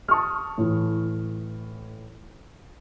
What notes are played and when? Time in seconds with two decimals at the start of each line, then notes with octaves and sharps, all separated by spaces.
0.08 A5 C#6 D#6 F6
0.58 A2 E3